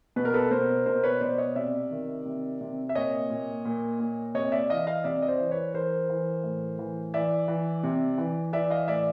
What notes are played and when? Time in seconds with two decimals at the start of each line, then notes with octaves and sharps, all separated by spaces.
0.16 B2 B4
0.25 A#4
0.34 A4 B4
0.51 B2 A#4 C5
0.86 B2 A#4 C5
1.03 B4 C#5
1.21 B2 C5 D5
1.38 C#5 D#5
1.55 C3 D5 E5
1.91 D#3
2.25 C3
2.61 C3
2.89 E5
2.95 A#2 C#5 D#5
3.30 A#2
3.65 A#2
4.00 A#2
4.34 C3 C#5 D#5
4.52 D5 E5
4.70 E3 D#5 F5
4.87 D#5 F5
5.04 C3 D5 E5
5.22 D#5
5.28 C5 D5
5.39 E3
5.51 B4 C#5
5.74 E3 A#4 C5
6.09 E3
6.44 A2
6.79 E3
7.14 E3 D5 E5
7.48 E3
7.83 C3
8.18 E3
8.53 E3 D5 E5
8.70 D#5 F5
8.88 A2 D5 E5